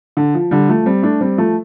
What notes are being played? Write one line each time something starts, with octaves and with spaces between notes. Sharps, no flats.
D3
F3
D3 G3
F3 A3
G3 C4
A3 D4
G3 C4
F3 A3